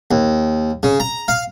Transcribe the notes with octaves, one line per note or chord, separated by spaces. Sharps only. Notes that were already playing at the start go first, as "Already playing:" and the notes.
D#2
C#3
A#5
F5